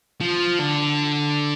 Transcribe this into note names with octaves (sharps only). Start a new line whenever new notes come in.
F3
D3